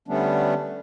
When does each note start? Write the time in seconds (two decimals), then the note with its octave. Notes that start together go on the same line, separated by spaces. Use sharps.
0.08 D3 G3 A3 B3 C#4 D4